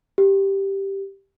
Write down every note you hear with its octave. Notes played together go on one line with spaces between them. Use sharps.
G4